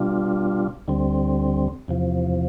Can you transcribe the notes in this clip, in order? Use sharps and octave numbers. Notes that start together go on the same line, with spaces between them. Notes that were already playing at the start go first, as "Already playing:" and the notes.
Already playing: B2 G3 D4 F4
D2 D3 G3 C4
E2 C3 F3